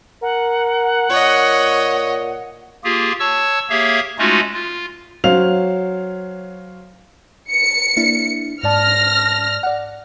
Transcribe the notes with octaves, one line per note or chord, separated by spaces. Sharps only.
A#4 F#5
A#2 C#5 D#5
A#3 F4 G4 G#4
C#5 A5 C#6 E6
A#3 G4 G#4 C#5 E5 F5
G#3 A3 C#4 D#4 F4 F#4
F4
F#3 C#4 C5 F5 F7
C#7
A#3 D4 E4
G#2 D5 A5 F6 A#6
D5 F#5